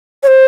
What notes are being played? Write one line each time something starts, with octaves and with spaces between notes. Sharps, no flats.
C#5
C5